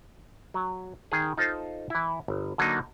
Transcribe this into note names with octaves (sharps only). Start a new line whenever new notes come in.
F#3
D#3 G#4
D#4 F4 A4 C5
E3 E4
G1
D3 F#3 A#3 D4 D#4